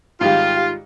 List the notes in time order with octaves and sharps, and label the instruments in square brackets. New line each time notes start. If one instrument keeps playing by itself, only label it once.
[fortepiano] G#2 D#3 G3 [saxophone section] F4 [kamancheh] G4 F5